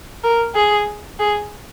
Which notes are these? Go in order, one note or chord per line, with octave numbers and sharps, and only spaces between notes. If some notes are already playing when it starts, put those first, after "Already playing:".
A#4
G#4
G#4